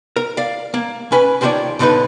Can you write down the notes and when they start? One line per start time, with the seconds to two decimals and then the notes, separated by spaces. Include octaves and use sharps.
0.16 A#4
0.37 D5 F5
0.74 A#3
1.12 C#4 B4 G#5
1.41 D#2 D#3 F3 A4 C#5 D5
1.79 B1 G2 D3 F3 D#4 B4